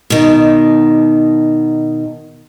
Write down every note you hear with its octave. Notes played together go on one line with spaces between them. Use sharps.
B2 D#3